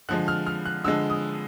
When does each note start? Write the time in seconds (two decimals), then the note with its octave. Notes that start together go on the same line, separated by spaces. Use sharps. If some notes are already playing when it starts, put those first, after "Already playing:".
0.09 D3 F3 G#3 F#6
0.28 F6
0.47 F6
0.66 F#6
0.84 D3 F3 G#3 E6
1.10 D#6